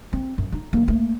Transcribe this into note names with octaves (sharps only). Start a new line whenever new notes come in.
C4
F#2
D#4
D#3 A#3
A3 A#3